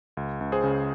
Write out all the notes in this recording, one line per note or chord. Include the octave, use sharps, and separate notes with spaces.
C#2
C#2
G#4 C5
C#3